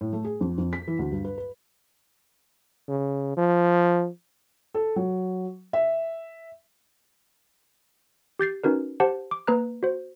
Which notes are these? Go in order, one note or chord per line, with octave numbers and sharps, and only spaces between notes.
A2
A3
G#4
F2
F2
B6
E3
D2
G2
B4
B4
C#3
F3
A4
F#3
E5
G4 G6 A6 C7
C#4 D#4 F#4 A#4 B4
G4 C5 F#5 A5
D6
A#3 B4 A#5 F#6
F#4 C5